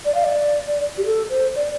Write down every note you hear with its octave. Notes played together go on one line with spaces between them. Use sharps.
D5
F5
D5
G4
A4
C5
D5